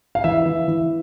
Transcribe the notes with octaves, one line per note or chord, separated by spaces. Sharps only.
F5
E3 E5
E3
E3